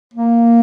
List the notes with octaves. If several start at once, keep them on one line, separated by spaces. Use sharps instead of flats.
A#3